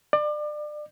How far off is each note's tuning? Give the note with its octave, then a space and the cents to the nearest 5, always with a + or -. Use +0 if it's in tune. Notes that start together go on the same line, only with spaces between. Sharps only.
D5 +30